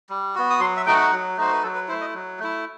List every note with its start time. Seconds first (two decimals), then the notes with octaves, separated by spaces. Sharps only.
0.10 G3
0.35 B3 F#4
0.50 D#6
0.60 F#3 C6
0.77 E5
0.86 A3 D#4 F#4 G5
0.94 F#5
1.12 F#3
1.37 A3 D#4 F#4 C5
1.52 B4
1.63 F#3 A4
1.75 B4
1.88 A3 E4 C5
2.01 D#5
2.14 F#3
2.39 A3 E4